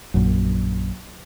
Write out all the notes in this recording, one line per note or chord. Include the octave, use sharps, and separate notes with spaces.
A#1 F#2